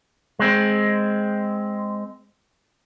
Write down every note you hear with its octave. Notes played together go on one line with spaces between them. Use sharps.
G#3 C4